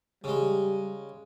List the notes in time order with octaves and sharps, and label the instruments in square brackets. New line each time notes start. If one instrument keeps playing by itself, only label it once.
[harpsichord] C#3 G#3 [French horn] G3